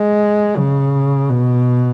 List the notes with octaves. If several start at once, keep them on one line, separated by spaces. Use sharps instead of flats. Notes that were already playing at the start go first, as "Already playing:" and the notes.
Already playing: G#3
C#3
B2